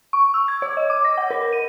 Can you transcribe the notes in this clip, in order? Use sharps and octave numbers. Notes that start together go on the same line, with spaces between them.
C#6
E6
G#6
C#5
D#5
D6
A#6
F#5
A#4
D#7